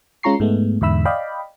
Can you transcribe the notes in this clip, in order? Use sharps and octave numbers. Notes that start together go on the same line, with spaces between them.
G#3 C#4 F4 A#5 C#6 C7
G#2 G#3 A3 B3
E2 G#2 D3 E5 B5 E6
D5 D#5 F5 G5 B5